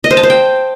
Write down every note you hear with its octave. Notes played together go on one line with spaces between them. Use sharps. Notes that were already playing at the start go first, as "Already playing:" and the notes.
D#5
C5
A5
C5
G5